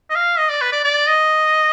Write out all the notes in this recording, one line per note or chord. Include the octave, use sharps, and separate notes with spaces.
D#5
F5
D#5
D5
B4
D5
D5
D#5